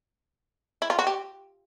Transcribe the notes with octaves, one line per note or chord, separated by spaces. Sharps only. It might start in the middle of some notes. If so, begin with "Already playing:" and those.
E4
F4
F#4
G4